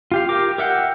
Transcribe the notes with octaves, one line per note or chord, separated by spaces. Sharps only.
F4 G4 F5
G4 A#4 D6
A#4 E5 F#5 G5